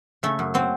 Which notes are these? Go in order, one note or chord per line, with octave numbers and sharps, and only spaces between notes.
C#3 A3
F#2
F#3 C4